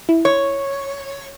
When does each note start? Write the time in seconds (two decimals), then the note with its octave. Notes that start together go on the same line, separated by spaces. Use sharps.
0.09 E4
0.25 C#5